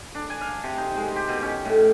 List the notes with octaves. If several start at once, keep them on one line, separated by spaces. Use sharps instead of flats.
D4
G#5
F5
C3
D#4
G#3
G4
B2
C#4
A2